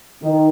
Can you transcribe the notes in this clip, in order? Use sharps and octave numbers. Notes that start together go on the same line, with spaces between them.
D#3